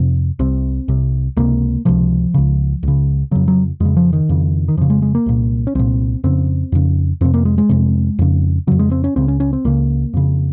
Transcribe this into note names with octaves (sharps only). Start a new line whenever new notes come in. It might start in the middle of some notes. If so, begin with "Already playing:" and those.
Already playing: F2 C3
C2 C3 C4
C2 C3
C#2 C3 A#3
C#2 C3 F3
C#2 C#3
C#2 C#3
F2 C#3 F#3
F#3
F2 C#3 G#3
F3
D#3
F2 C#3
D#3
F2 C#3 F3
G#3
G#3
A#3
C2 A#2
C#4
C2 A#2 C4
F2 C#3 C4
F2 C#3
F2 C3 C4
A#3
G#3
G#3
F2 C3
F2 C#3
F2 C#3 F#3
G#3
C4
C#4
C#2 C#3 C4
C#4
C#4
C4
C#2 C#3 A#3
F2 C#3